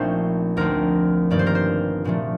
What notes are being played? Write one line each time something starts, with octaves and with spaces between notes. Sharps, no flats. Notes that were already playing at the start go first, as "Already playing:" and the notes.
Already playing: A#1 A#2 A3 C4 D#4 C5
D2 D3 F3 C4 D#4 A#4
G1 G2 D#3 A#3 D#4 D5
C5
A#4
C5
A#1 A#2 F3 A3